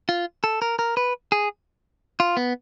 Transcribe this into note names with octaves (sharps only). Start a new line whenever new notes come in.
F4
A4
A#4
A#4
B4
G#4
F4
B3